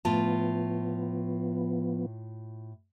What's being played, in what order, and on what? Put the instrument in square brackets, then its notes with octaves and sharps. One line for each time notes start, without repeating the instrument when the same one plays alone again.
[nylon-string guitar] A2 F4 A5 [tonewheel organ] F3 B3